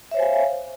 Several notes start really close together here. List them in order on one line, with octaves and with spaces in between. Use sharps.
E5 C#5 C5 G#5 F5